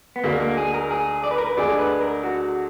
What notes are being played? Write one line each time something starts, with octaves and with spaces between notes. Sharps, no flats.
B3
D2 D3 G#3 A#3 D4 F#4
A#3
G#4
A#4
G#4
D5
B4
A#4
B4
D2 D3 G#3 D4 G#4 D5
B4
A#4
F#4